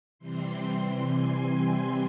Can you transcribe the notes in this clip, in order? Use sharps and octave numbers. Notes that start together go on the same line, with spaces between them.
C3 E3 G3 C4 C6
C6
G#5